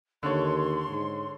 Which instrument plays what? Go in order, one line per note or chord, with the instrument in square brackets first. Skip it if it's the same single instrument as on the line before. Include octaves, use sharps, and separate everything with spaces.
[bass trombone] D#2 [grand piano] D3 C#5 [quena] C6
[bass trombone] G#2